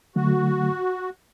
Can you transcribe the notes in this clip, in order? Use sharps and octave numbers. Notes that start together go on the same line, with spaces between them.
D3 F#3 A3 F#4